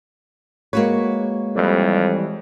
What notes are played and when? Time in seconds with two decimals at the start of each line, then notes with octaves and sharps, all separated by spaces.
0.73 G#3 A#3 F#4 B4 C#5
1.56 F2 E3 G3